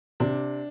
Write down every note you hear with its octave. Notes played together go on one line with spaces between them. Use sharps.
C3 D4